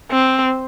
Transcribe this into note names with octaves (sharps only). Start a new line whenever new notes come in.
C4